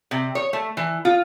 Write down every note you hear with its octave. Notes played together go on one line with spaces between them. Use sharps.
C3
C#5
A3
E3
F4